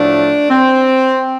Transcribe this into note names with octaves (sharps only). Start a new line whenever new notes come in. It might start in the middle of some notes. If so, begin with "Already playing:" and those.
Already playing: A2 F3 A3 D4
C4